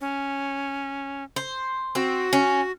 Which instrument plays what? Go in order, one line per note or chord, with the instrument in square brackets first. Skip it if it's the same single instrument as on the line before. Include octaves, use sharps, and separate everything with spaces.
[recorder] C#4
[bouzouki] C5
[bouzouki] C4 [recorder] F#4
[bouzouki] C#4